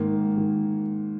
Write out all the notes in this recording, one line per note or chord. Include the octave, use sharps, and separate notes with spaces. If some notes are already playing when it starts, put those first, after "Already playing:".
Already playing: G#2 D#3 A#3
D#3